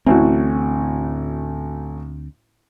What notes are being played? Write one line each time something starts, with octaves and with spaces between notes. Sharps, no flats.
A1 D2 A2 C4 F#4